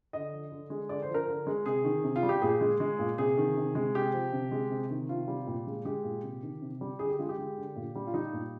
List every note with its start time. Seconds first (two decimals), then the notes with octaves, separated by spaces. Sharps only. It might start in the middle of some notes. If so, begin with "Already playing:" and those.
0.13 D3 D#5
0.32 F3
0.52 D3
0.70 G#3
0.89 D3 D5
1.02 C5
1.09 F3
1.14 A#4
1.28 D3
1.47 G#3
1.66 C3 G#4
1.84 D#3
2.04 C3
2.16 F4
2.23 G3
2.29 G4
2.42 A#2 G#4
2.61 G#3
2.80 G#3
2.99 A#2
3.18 C3 G#4
3.37 D#3
3.56 C3
3.75 G#3
3.95 C3 G4
4.13 F3
4.33 C3
4.52 G#3
4.70 C3
4.90 D#3
5.09 C3 F4
5.28 G3
5.47 A#2
5.67 G#3
5.85 G#3 G4
6.04 A#2
6.23 C3
6.43 D#3
6.62 C3
6.81 G3
6.99 D3 G#4
7.09 G4
7.18 G#3 F4
7.29 G4
7.38 G#3
7.57 D3
7.76 A#2
7.95 G3
8.07 F4
8.14 G3 D#4
8.33 A#2